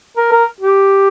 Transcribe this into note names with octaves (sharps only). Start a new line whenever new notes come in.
A#4
A#4
G4